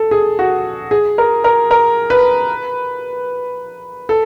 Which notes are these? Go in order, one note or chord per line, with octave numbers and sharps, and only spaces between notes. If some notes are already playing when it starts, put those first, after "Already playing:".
Already playing: A4
G#4
F#4
G#4
A#4
A#4
A#4
B4
A4